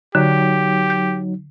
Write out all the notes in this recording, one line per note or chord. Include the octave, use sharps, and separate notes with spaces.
D3 F#3 D#4 G4
G6